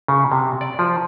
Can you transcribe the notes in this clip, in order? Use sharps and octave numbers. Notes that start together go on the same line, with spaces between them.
C#3
C3
D5
F3